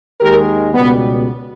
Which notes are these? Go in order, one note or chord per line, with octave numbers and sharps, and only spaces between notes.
D#2 D#3 G#3 G4 A#4
C#2 B2 G3 B3